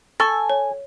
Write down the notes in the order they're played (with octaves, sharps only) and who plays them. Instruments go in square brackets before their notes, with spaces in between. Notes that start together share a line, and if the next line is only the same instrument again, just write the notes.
[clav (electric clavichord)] A4 [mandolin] G#5 [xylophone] C#6 A6
[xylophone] C#5